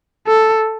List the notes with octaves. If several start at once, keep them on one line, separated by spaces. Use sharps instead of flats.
A4